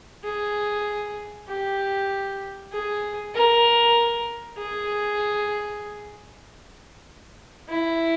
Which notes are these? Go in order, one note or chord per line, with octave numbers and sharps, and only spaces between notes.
G#4
G4
G#4
A#4
G#4
E4